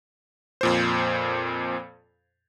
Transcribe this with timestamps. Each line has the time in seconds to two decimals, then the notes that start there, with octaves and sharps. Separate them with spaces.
0.61 F2 A#2 C5